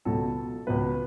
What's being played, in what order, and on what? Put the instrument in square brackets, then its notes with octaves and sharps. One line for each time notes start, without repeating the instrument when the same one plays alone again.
[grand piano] C#2 B2 F#3 A4
C#2 B2 F#3 B4